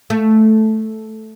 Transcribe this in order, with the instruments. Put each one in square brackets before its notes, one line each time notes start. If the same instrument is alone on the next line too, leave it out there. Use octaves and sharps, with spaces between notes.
[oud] A3